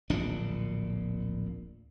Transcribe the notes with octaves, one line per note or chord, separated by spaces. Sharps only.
D1 A#1 A#2 D4